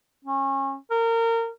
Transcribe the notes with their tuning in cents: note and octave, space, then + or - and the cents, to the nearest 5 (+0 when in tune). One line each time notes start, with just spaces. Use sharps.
C#4 -30
A#4 -25